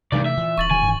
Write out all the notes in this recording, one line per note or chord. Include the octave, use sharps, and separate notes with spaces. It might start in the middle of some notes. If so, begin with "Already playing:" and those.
G2 C3 E3 A3 D#4 D5
E5
A#2 E3
D#1 C#6 A6 F#7
D#3 E3 G3 G#5
G2 D#3 E3